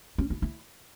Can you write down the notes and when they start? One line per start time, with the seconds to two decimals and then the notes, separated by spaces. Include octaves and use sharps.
0.18 C#4
0.30 E4
0.42 E4